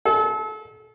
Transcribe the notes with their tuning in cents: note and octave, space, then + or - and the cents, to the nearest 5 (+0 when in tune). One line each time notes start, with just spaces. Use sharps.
A4 -35